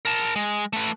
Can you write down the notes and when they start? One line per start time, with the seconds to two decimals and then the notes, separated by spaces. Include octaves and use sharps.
0.05 A#4 A5
0.36 G#3
0.73 A3 B4